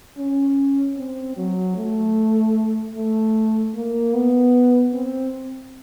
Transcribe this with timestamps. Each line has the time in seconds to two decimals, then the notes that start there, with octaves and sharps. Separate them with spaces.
0.18 C#4
0.98 C4
1.37 F#3
1.76 A3
2.95 A3
3.75 A#3
4.14 B3
4.93 C4